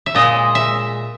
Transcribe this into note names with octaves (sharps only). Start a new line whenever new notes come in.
E5
A#2 G#3 D#5
E5